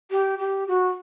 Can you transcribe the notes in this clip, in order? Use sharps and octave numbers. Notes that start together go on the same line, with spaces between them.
G4
G4
F#4